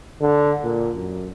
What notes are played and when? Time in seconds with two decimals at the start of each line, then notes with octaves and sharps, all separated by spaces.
0.21 D3
0.63 A#2
0.95 F#2